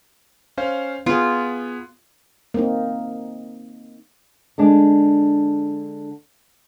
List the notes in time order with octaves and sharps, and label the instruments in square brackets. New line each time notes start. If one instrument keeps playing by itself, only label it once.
[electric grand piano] C#4 C5 F5
[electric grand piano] B3 G#4 [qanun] F4
[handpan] A#3 C4 D#4
[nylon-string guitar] D3 G#3 D4